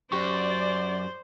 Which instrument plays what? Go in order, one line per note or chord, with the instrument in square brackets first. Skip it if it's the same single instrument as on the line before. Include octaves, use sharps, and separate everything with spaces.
[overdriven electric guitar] F#2 [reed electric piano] G4 C#6 [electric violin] C5 [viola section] D5